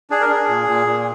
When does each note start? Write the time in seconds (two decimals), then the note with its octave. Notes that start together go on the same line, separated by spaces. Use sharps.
0.10 D4 G#4
0.21 A#4
0.29 D4 G#4
0.49 A#2
0.68 A#2
0.87 A#2